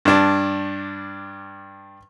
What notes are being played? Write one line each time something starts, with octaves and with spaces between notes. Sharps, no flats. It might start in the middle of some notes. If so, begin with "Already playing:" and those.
G2 D4